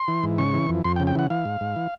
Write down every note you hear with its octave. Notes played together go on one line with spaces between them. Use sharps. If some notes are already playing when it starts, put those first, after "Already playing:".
Already playing: C6
E3
G#2
C#3 C#6
E3
F2
F2 C6
G5
C#3
G5
E3 F#5
E3 F5
G#2
G#2
E3